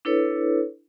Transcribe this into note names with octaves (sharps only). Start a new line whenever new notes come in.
D4 E4 A4 B4 C#5